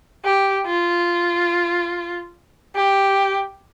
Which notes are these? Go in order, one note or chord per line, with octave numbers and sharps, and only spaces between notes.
G4
F4
G4